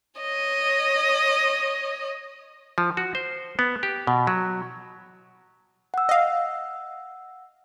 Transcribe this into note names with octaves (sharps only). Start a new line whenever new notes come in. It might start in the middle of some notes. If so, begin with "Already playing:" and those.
C#5 D#5
F3
F#4
C5
B3
G4
B2
F#3
F#5 E6
D#5 F5